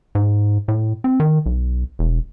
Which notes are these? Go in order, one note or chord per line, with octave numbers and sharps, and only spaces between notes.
G#2
A2
C4
D#3
B1
E1